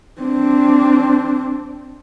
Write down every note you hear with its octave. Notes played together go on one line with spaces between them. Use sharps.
C4 D4